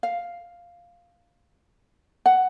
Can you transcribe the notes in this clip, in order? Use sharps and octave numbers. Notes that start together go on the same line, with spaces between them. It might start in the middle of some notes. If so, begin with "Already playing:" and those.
F5
F#5